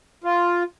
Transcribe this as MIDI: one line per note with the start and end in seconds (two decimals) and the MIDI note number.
0.24 0.63 65